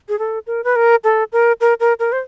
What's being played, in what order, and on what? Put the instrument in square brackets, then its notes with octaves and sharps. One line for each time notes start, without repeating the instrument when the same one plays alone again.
[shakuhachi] G#4
A4
A#4
B4
A#4
A4
A#4
A#4
A#4
A#4
C5